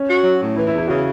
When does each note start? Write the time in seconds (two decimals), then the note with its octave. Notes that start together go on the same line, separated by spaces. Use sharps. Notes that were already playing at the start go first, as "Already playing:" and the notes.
Already playing: C#4
0.08 F#4
0.24 F#3
0.40 A2
0.56 E3 E4
0.67 E4
0.72 E2
0.78 E4
0.88 C#3 F#4